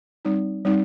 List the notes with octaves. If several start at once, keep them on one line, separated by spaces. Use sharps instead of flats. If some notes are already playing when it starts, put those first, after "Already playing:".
G3 C4 D#4
G3 C4 D#4